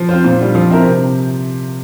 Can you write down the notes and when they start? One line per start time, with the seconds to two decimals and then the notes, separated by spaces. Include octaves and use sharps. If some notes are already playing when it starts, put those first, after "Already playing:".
Already playing: F3
0.09 C4 F4 C5
0.25 A#2
0.39 G3 D4 F4
0.55 F3
0.70 C4 E4 A#4
0.85 C3